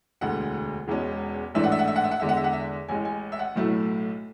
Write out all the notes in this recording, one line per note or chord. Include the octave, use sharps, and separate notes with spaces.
E1 D2 D3 F#5
E1 E2 B2 G#3 C#4
A1 G#2 E3 A3 D4 E5
F#5
E5
F#5
E5
F#5
E5
F#5
E2 D3 G#3 E5
F#5
E5
F#5
E5
A1 A2 G#3 G#5
G#5
E5
F#5
B1 A2 F#3 A3 E4